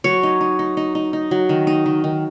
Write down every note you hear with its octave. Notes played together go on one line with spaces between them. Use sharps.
F#3 C#5
D#4
D#4
D#4
D#4
D#4
D#4
F#3
D#3
D#4
D#3
D#3